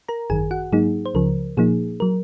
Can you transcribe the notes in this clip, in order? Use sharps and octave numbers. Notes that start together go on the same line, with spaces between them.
A#4 A#5
G#1 F#2 D#3 G#4 G#5
F#4 F#5
G#2 F#3 A#3 D#4 G#4
C5
C#2 C#3 F3 A#4
A#2 F3 A#3 D#4 G#4
F#3 A#4